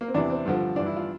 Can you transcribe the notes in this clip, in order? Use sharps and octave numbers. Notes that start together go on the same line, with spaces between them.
A#3
C4
E2 C3 E3 D4
C4
G2 D3 F3
G2 E3 D4
E4
F4